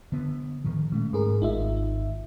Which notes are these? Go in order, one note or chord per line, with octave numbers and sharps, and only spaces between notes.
D3 B3
A2 D#3 F3
A#2 G#3 A3 C#4
G#2 G#4 A#4
G#1 D#4 F4 E5